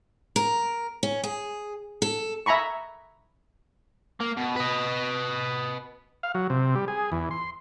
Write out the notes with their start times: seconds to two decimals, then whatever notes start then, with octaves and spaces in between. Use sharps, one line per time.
0.36 A#4
1.03 C#4
1.24 G#4
2.02 A4
2.46 E5 G#5 A#5 B5 C#6
4.21 A#3
4.37 B2
4.56 B4 D#5
6.23 F5
6.35 F#3
6.50 C3
6.75 G3
6.88 G#4
7.12 E2
7.31 C6